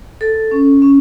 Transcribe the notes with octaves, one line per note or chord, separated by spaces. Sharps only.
A4
C#4
C#4